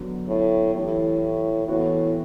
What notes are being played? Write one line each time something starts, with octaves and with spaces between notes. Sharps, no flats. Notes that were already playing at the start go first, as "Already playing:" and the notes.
Already playing: D3 F#3 B3
A2
A2 E3 A3 E4 G4
A2 E3 B3 F#4